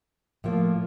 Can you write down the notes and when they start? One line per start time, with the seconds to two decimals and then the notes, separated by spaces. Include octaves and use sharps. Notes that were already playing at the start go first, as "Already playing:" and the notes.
0.44 A2 F3 A#3